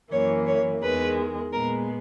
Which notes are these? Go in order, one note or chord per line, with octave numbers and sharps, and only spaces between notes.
F#2 E3 A#3 C#5
C#5
E2 D#3 G#3 B4
A#2 G#3 B3 A#4